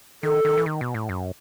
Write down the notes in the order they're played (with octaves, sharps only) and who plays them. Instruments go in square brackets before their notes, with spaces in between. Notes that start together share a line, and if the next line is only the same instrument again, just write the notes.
[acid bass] D#3 [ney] A4
[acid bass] D#3
E3
D#3
B2
A2
F#2